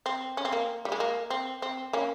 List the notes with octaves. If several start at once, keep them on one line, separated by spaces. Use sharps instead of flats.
C4
C#4
C4
A#3
G3
G#3
A#3
C4
C4
A#3 C#4